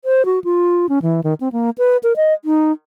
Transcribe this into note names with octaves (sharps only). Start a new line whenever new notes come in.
C5
F#4
F4
C#4
E3
D#3
C4
A#3
B4
A#4
D#5
D#4